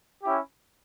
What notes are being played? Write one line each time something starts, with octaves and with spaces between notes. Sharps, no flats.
C#4 E4 G4